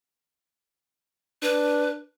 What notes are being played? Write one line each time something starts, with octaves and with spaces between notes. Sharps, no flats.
D4 B4